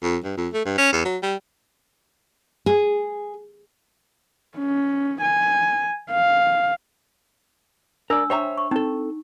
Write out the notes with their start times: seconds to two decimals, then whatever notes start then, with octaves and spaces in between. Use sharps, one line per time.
0.02 F2
0.24 G2
0.37 F2
0.53 A3
0.65 G2
0.78 C#4
0.92 E2
1.05 F#3
1.22 G3
2.66 G#4
4.58 C#4
5.22 G#5
6.11 F5
8.10 D4 A#4 D5 E6
8.30 C5 C#5 E5 G5 A#5
8.58 C#6
8.71 C4 D#4 A4